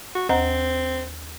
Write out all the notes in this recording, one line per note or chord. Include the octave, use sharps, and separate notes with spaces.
F#4
D#2 C4 F#5 A#5